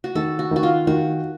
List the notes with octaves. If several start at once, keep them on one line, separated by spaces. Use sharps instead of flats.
F#4
D#3 A4
F#4
D#3 F#4
F4
D#3 F#4